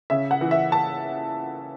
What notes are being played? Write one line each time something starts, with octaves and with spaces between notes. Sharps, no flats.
C#3 E5
F#5
E3
E5
A5